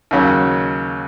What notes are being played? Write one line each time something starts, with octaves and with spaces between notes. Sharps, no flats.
D#2 C#3 F#3